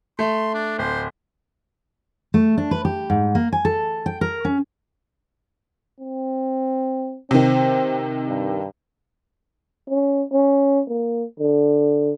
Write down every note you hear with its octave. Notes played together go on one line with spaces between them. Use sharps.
A3 C6
D4
D1 C5
A3
D4
B4
G4
G#2
A#3
G#5
A4
G5
A#4
C#4
C4
C3 D#3 C4
G2
C#4
C#4
A#3
D3